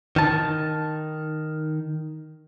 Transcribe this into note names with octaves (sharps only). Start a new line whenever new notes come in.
D#3 A5